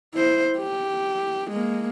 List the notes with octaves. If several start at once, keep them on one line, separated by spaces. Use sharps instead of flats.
E4 C5
G4
G#3 A#3